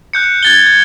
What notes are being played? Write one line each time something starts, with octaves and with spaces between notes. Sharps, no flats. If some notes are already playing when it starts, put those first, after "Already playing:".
F#6 G6 C#7
G#6 A6 G7
G#6